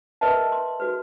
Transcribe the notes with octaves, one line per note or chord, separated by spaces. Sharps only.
A#4 B4 D#5 E5 A5
A#4
C6
F#4 B4